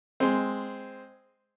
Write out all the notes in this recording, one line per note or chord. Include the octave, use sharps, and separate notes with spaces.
G#3 C4